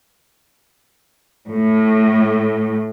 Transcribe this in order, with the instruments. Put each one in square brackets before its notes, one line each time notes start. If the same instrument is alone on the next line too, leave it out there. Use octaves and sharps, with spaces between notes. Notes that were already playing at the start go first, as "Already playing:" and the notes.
[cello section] A2